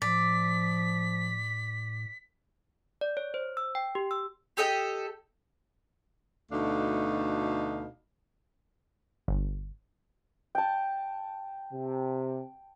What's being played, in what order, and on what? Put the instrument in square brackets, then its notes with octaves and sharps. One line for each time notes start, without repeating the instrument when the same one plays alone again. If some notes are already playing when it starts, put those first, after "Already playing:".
[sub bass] A2 [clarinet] F3 [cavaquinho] D5 [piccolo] B6
[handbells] D5
C#5
C5
E6
G5
G4
E6
[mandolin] G4 A4 D#5 G5
[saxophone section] D2 B2 A3 D4 D#4 F5
[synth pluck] G1
[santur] G5 A5
[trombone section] C3